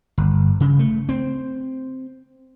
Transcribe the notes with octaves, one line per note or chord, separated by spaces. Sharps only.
G1
C#3
A3
C4